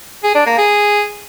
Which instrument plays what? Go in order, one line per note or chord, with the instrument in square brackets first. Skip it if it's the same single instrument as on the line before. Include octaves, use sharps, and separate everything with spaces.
[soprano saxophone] G#4
D4
A#3
G#4